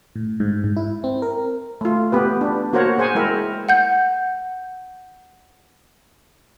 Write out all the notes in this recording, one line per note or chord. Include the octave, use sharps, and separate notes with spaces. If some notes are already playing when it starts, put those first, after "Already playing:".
A2
G#2
G#2
E4
C4
A#4
A3 F4
B3 G4 B4
D4
A#3 F#4 A#4 C5 C#5 F#5
G#4 C5 F#5 G#5
G#3 E4 A#4 E5 G5
F#5 G6